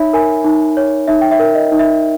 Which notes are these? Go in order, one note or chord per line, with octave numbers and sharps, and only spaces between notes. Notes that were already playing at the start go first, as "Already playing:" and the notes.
Already playing: D#4 C#5 E5 B5
A#4 G#5
D#4
C#5
D#4 E5
G5
E5
A#4
D#5
D#4
E5